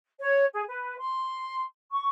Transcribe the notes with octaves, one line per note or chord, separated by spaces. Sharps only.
C#5
G#4
B4
C6
C#6